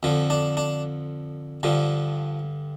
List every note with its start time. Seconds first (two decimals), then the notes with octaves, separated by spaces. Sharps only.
0.03 F2 D3 F3
0.30 D4
0.57 D4
1.63 G2 D3 F3